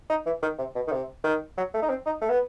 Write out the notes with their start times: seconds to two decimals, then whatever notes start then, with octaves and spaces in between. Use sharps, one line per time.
0.09 D#4
0.26 E3
0.42 D#3
0.59 C3
0.75 B2
0.87 D#3
0.92 C3
1.24 D#3
1.57 F#3
1.74 A3
1.82 D#4
1.89 C4
2.06 D#4
2.21 A3
2.30 B3